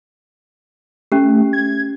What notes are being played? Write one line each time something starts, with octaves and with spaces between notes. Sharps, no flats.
A3 C#4 G4
G#6